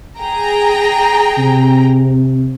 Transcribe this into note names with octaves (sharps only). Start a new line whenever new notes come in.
G#4 G5 A#5
C3